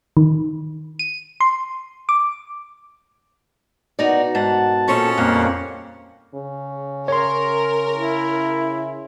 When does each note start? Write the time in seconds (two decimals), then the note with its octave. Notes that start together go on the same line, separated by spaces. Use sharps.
0.17 D#3
0.99 D#7
1.41 C6
2.09 D6
3.99 B2 D#4 F#4 A#4 D5 A#5
4.35 G#2 F#5 A5
4.88 A#2 C#4 A4 C5 D#5
5.17 F2 A#2 G3 A#3 F#5
6.34 C#3
7.08 A#4 C#5 C6
7.94 E4